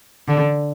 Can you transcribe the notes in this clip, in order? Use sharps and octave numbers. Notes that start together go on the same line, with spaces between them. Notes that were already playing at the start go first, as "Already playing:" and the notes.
D3